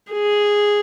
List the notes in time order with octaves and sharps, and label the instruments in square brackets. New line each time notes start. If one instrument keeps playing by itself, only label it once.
[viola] G#4